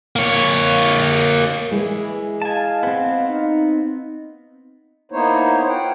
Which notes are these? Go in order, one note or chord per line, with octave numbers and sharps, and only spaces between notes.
A#3 C#5
E3 G#3 E4 G#4
D#5 F5 G#5 A5
B3 C4 C5
D#4
A#3 B3 D#4 E4 C5 C#5
F4 C5 F#5 G5